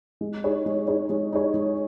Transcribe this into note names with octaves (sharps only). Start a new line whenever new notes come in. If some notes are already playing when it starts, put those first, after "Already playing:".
G#3
D#4 G#4 C#5
G#3
D#4 G#4 C#5
G#3
D#4 G#4 C#5
G#3